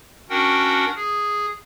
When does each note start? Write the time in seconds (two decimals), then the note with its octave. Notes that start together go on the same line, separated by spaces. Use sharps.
0.30 C#4 D4 F#4 A#4 F#5 G5
0.96 G#4